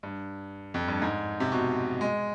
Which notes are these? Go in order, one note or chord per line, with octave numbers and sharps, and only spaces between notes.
G2
F2
G2
G#2
C3
B2
G#3